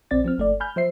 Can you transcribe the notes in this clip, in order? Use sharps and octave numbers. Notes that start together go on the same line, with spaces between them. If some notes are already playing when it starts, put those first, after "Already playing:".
A#1 C4 D5 A6
F3 C4 F6
G1 A3 D5
G#5 B5 F6 G6
F3 C5 E5 C7